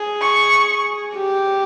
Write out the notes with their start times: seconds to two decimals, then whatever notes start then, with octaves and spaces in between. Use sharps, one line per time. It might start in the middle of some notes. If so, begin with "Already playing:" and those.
Already playing: G#4
0.21 C#6
1.15 G4